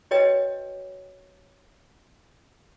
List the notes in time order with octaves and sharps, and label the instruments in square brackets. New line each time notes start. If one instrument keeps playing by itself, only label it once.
[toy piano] F#4 B4 C#5 D#5 G5